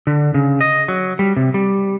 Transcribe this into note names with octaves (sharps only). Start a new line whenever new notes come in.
D3
C#3
D#5
F#3
G3
C3
G3